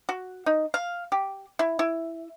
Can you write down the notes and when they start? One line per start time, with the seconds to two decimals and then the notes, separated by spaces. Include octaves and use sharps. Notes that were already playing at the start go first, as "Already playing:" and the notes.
0.09 F#4
0.46 D#4
0.74 F5
1.12 G4
1.59 E4
1.79 E4